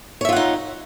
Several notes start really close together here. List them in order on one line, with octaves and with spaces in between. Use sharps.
C#5 E5 F4 F#5 D#4